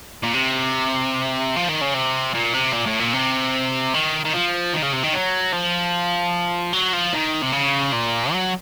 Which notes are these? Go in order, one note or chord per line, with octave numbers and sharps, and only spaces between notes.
A#2
C3
F3
D#3
C#3
C3
A#2
C3
A#2
A2
A#2
C3
D#3
D#3
F3
D#3
C#3
C3
D#3
F#3
F3
F#3
F3
D#3
C3
C#3
A#2
F#3